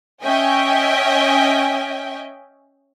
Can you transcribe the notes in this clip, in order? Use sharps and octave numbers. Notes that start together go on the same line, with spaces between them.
C#4 D#5 E5 G5 G#5